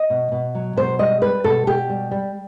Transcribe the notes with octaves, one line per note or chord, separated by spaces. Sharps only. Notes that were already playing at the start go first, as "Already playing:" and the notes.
Already playing: D#5
B2
B2
F#3
B2 C5
G3 D#5
G3 B4
B2 A4
B2 G4
G3
G3